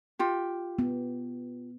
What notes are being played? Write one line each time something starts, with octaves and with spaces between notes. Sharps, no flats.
F4 G4
B3